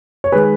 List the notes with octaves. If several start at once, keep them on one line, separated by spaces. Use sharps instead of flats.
C#5
D#3 G#3 G#4 B4